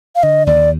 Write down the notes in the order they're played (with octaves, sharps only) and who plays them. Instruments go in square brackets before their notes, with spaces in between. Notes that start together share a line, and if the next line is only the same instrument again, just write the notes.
[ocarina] F5
[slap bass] D3 [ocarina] D#5
[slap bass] D#2 [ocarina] D5